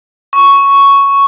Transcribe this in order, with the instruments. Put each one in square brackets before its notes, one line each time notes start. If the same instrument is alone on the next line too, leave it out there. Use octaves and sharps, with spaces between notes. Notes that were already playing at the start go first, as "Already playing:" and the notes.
[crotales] C#6